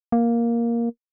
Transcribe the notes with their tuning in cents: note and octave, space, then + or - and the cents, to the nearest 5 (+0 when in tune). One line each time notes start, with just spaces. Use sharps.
A#3 +5